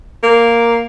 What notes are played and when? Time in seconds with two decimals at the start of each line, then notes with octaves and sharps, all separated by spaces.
0.23 A#3